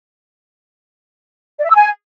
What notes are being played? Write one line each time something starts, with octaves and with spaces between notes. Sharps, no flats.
D5
E5
E6
G#5